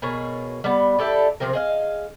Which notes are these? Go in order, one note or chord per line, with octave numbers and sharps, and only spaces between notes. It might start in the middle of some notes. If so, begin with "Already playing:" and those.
B2 A#3 G#4 C#5
G3 B3
E4 G4 A4 D5
C3 F3 C4 A#4
G#4 D#5 F5